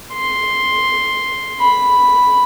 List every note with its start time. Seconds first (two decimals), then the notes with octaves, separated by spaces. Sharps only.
0.13 C6
1.60 B5